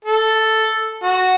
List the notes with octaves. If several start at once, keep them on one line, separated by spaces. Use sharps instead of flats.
A4
F#4